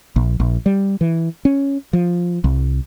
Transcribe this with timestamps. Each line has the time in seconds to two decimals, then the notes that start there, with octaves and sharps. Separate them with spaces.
0.16 A#1
0.40 A#1
0.66 G3
1.01 E3
1.45 C#4
1.93 F3
2.44 C2